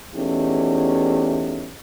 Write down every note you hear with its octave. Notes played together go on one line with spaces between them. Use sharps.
E2 A3 C#4 D#4 G4